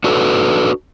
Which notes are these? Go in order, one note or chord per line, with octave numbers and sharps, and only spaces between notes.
D4 F#4 A4 B4